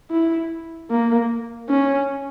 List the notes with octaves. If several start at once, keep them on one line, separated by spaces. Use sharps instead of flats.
E4
A#3
C#4